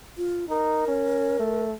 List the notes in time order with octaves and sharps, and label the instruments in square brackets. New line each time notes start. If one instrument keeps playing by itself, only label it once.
[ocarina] F4
[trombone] D#4 [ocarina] A#4
[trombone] C#4
A3